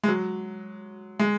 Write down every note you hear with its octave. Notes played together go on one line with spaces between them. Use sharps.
G#3
F#3
G#3